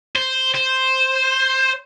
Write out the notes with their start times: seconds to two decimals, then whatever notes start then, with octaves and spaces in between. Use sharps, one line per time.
0.16 C5
0.55 C5